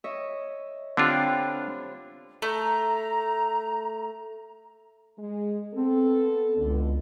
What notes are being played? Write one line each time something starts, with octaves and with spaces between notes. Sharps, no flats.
C#5 D#5 E5
D3 C4 D4 F4 G4 B5
A3 A#5
G#3
B3 C4 A4
C#2 F#2 D3